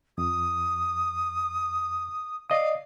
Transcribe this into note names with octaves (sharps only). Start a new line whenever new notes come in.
F2 D#6
D5 D#5 F5 D#6